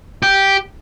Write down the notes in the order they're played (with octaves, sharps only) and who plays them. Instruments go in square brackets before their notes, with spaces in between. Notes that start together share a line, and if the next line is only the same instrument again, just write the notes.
[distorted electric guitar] G4